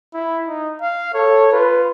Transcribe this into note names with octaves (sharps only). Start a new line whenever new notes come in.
E4
D#4
F5
A4 C#5
F4 B4